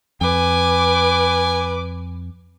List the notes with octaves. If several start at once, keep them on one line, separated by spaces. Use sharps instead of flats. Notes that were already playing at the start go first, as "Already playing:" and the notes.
F2 B4 G#5 D6